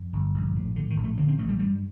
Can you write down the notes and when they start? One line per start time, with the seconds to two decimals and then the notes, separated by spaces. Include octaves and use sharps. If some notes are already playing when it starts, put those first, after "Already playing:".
Already playing: F2
0.13 G1
0.34 A#1
0.55 A2
0.75 A2 D3
0.90 D#3
0.96 A#1
1.04 A3
1.18 D3 A#3
1.28 C4
1.38 A1 A3
1.49 G3
1.59 G2 G3